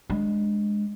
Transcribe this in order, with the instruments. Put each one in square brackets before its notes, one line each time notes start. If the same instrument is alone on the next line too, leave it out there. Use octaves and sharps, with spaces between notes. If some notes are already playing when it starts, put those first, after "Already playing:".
[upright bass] G#3 D4